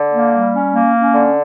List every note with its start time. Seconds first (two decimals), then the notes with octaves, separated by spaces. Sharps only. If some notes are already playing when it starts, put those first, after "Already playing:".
Already playing: D3
0.12 A#3
0.32 G3
0.53 C#4
0.73 A#3
0.94 C#4
1.15 D3